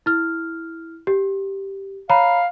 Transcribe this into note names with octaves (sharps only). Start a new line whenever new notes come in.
E4 F6
G4
C#5 F5 A#5 B5